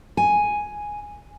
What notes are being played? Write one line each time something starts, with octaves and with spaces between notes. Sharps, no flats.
G#5